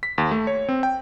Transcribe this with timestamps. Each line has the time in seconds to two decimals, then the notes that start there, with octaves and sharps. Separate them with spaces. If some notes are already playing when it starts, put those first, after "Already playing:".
0.03 B6
0.18 D#2
0.31 A3
0.47 C#5
0.69 C4
0.83 G5